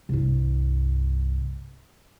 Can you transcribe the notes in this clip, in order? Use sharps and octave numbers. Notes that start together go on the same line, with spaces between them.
C2 G2